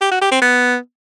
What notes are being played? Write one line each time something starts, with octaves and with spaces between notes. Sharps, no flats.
G4
F#4
G4
C4
B3